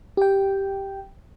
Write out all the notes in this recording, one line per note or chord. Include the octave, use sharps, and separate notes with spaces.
G4 G5